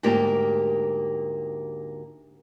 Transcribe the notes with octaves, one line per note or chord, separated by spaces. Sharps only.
D2 G#2 A#3 G4 A#4